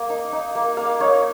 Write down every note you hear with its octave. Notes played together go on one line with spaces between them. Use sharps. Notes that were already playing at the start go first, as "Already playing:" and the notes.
Already playing: A#3
D#4
D#4
A#3
A#3 F5
D#4 C#5